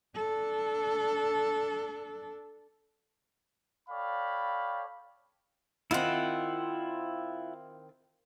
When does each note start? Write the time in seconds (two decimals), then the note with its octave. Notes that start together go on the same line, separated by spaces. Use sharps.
0.15 D4 A4
3.89 A4 C#5 D5 F5 G5 B5
5.91 D#3 C4 E4 F4 F#5